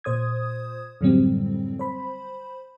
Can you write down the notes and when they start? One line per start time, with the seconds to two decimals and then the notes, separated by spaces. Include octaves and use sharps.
0.04 A#2 C5 D#6 G#6
1.01 F#2 A2 D3 F#3 G3 C4
1.79 C5 B5